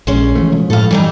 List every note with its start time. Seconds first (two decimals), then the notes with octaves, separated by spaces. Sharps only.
0.07 A#1 G#3 C#4
0.35 E3 F3 A3
0.52 B2 F3 G#3
0.70 A2 A4 F5
0.91 E3 F#3 G3 D#4